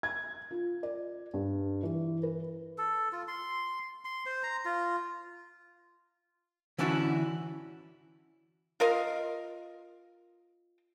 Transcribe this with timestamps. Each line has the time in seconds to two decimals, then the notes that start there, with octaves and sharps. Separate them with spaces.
0.03 G#6
0.51 F4
0.83 D5
1.34 G2
1.83 E3
2.23 B4
2.78 A4
3.13 F4
3.28 C6
4.05 C6
4.26 C5
4.43 A#5
4.65 F4
6.78 D3 E3 C#4 D4 E4 F#4
8.80 F4 A#4 D#5 F5